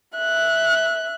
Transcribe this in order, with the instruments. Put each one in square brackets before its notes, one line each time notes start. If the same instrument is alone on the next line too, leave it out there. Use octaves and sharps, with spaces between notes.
[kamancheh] E5 F#6